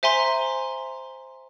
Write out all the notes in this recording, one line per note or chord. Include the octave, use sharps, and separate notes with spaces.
C5 E5 G#5 A#5 C6